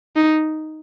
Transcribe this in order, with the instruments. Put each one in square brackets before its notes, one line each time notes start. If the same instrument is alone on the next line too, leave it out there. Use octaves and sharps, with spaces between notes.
[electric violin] D#4